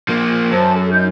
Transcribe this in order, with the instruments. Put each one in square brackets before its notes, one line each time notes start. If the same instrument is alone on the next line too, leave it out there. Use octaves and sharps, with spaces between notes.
[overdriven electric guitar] F3 A#3
[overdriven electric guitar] F#2 [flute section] C5 A5
[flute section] A4
D#4 G6